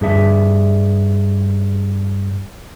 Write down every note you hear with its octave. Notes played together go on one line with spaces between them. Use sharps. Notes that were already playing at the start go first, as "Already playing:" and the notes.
G2 G#4 E5